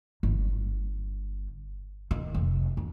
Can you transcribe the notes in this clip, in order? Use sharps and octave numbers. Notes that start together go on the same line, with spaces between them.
G1
D#3
F1
B3